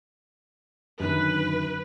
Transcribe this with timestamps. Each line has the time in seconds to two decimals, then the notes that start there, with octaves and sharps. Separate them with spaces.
1.00 F#2 D3 D#3 B4